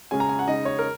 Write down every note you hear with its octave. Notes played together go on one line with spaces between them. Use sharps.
C#3 G#3 C#4 G#5
A#5
G#5
F#5
C#3 G#3 D#4 D#5
C#5
A#4